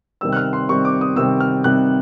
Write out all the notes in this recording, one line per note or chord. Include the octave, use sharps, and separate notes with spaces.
C3 D#3 G3 C4 E6
F#6
F6
C6
C3 D#3 G3 C4 C#6
D6
D#6
C3 D#3 G3 C4 E6
F6
C3 D#3 G3 C4 F#6